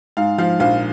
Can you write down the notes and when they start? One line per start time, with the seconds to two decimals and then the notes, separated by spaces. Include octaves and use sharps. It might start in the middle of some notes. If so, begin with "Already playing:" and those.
0.17 G#2 F5
0.38 F3 F5
0.60 A#1 F5